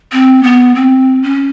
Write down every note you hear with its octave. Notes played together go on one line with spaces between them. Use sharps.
C4
B3
C4
C#4